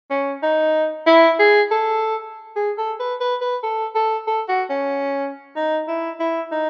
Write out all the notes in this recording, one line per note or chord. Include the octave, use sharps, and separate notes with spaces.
C#4
D#4
E4
G#4
A4
G#4
A4
B4
B4
B4
A4
A4
A4
F#4
C#4
D#4
E4
E4
D#4